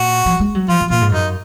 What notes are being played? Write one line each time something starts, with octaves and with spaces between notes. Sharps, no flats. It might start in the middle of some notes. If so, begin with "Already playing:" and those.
Already playing: A#2 F#4
F3
G#3
F#3
F3 F4
F3
A#2 F4
G#2
F#2 D#4